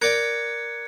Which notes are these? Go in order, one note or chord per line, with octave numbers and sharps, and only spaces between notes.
A#4 D5 G5 F#6 G#6 C#7